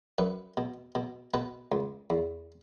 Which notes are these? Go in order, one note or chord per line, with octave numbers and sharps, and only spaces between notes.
F#2 B4
B2
B2
B2 B4
C#2
E2